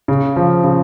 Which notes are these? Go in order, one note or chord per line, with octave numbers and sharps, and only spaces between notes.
C#3
F3
C#3